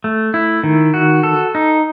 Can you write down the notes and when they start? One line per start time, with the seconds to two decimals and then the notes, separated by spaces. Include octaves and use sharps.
0.04 A3
0.34 E4
0.64 D#3
0.94 F#4
1.23 A4
1.55 D#4